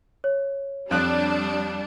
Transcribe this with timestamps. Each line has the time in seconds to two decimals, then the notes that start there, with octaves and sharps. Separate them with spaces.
0.24 C#5
0.91 F2 G3 D4 F#6